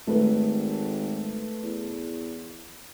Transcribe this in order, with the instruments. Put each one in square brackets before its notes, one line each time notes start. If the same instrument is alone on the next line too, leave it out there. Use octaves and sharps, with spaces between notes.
[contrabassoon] G#1 [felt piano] A3 B4
[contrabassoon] E2